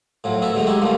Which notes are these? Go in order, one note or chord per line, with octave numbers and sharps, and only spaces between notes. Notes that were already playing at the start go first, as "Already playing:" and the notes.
A2 F3 F#3
B3 C#4 F#4 A4 E5
D3 F#3 G#3 A3 D#4
G#3 D#4 E4 F#4 G4 A4
D3 F3 G3 A3 A#3